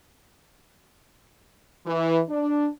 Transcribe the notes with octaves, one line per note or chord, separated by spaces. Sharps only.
E3
D4